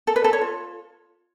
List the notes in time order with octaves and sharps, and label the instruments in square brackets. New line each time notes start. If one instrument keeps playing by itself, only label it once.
[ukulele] A4
B4
A4
C#5
F4